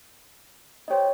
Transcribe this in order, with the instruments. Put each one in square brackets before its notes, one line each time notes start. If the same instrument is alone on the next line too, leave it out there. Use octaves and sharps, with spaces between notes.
[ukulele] D#4 G4 C5 [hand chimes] C#5 D#5